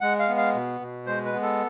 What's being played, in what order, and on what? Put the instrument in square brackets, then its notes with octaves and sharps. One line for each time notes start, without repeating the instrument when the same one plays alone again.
[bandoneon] G#3 F#5
F5
B3
F5
B2
B2
G#3 C5
B4
B3
A4